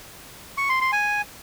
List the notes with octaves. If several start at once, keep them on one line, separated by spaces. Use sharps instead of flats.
C#6
C6
C6
G#5